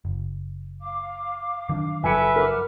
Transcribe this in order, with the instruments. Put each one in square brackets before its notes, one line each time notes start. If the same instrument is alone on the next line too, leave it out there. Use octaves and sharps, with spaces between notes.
[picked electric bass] F#1
[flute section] F5 D6
[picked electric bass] D#3 F#3 D4
[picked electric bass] F#1 F3 F#3 [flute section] A4 [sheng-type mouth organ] B4 E5 [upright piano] G#5 C#7
[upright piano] A#4 [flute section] F#5 D6 F6